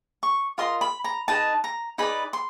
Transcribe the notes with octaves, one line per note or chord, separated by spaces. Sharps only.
C#6
F4 A#4 D#5 C6
B5
A#5
D#4 G#4 B4 D#5 A5
A#5
D#4 G#4 B4 D5 B5
C6